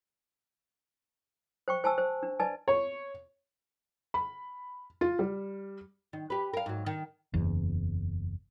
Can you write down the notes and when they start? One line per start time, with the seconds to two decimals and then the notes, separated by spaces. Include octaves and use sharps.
1.68 C5 G5 C#6
1.84 C5 G#5 A5 E6
1.98 C5
2.23 D4
2.40 B4 D5 D#5 G#5 A5
2.68 C#5
4.14 B5
5.01 F4
5.19 G3
6.13 D#3
6.30 G4 B4
6.53 A#4 F5
6.66 G#2 F#3
6.86 D#3
7.34 F#1 E2